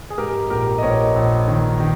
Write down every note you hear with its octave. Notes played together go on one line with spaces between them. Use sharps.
G#4
G#2 G4 A#4
A#1 G4 A#4
D#5
A#1 A#4 C#5
A#1
D#3
D#3